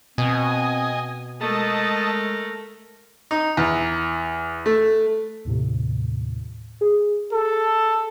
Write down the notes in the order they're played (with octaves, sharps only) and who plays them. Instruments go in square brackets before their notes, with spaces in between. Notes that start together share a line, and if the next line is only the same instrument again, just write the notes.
[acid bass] B2 [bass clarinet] C4 [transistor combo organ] D#5 G#5
[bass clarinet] G#3 [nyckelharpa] A3 A#4 [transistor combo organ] D#5 A5
[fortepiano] D#4
E2
A3
[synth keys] D#2 A2 C3
G#4
[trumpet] A4